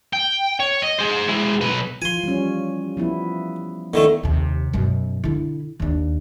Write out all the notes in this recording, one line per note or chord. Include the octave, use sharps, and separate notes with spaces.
G5
C#5
D#5
G#4 C5
G#3 E4
B1 B4
E3 F3 F4 G#5 C6
G3 C#4
F3 B3 E4
D3 D#3 A3 B3 E4
D#2 C3
F#2 B2
D3 E4
D#2 D4